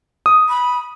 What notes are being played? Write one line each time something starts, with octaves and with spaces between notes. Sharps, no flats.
D#6
B5